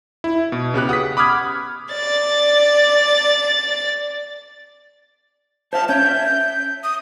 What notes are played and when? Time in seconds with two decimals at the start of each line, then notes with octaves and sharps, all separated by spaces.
0.24 E4
0.52 B2
0.74 C#3 B3 G4 F#6
0.89 F#5 D#6 F#6 B6
1.17 B5 D6 D#6 F6 G#6
1.92 D5 A6
5.73 C5 E5 F5 A5
5.89 C#4 C#5 G6
6.03 C#5 E5
6.84 D#6